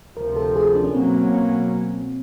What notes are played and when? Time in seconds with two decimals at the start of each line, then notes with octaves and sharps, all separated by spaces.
0.16 D2 C3 F3 A#4
0.36 A4
0.56 G#4
0.75 D4
0.84 C#4
0.95 B2 F#3 A#3 C4 C#4